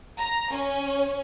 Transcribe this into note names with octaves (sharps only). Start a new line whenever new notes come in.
A#5
C#4